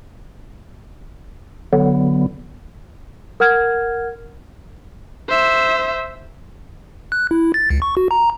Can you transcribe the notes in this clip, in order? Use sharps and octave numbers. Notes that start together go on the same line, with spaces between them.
D3 F#3 B3
A#4 F#5 F6 G#6
C5 E5
F#6
E4
A6
C#2
C#6
F#4
A#5